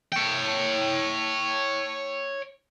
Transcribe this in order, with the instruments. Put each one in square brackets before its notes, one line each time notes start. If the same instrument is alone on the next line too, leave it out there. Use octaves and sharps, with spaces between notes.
[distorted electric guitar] C#5 G5